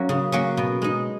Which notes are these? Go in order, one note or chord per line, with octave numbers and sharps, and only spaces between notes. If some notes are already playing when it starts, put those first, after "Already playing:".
Already playing: F#3 A#3 C#4
C#3
F#3 A#3 C#4
B2
G#3 D#4